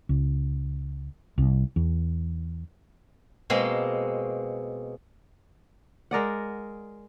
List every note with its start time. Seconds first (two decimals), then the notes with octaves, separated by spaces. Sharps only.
0.09 C#2
1.38 C2
1.76 E2
3.50 B2 G#3 A#3 C4
6.11 G#3 A#4 D5 F#5